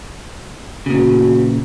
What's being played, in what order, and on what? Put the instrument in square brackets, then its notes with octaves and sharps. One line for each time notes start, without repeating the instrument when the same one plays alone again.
[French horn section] E2 F#4 [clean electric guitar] A#2 C#3